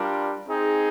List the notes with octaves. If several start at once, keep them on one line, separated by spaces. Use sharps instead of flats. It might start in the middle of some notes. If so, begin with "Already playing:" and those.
Already playing: G3 D4 F4 A#4
C4 D#4 G#4